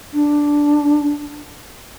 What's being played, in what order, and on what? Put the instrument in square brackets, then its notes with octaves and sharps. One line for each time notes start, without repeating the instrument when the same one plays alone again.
[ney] D4